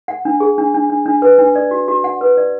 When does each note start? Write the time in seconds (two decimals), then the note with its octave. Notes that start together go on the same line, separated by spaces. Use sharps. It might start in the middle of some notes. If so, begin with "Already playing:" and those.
0.08 F#5
0.25 D4
0.40 G#4
0.58 D4
0.74 D4
0.90 D4
1.06 D4
1.22 B4
1.38 D4
1.55 D5
1.71 F#4
1.88 F#4
2.04 F#5
2.21 B4
2.37 D5